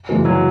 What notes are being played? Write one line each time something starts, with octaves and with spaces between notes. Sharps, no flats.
F#2 C#3 E3 G#3
F#3